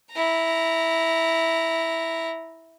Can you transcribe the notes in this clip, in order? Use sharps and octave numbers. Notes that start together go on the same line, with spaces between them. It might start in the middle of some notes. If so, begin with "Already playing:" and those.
E4 A#5